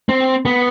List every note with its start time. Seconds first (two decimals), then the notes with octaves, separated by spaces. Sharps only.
0.09 C4
0.45 B3